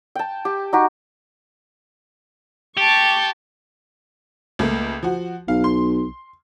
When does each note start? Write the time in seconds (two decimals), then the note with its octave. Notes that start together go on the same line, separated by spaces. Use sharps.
0.15 G5 A5
0.45 G4
0.73 D#4 F#4 G4
2.77 G4 A5 C#6
4.59 C#2 A3 A#3
5.03 F3 F#4
5.48 B1 F5
5.64 C6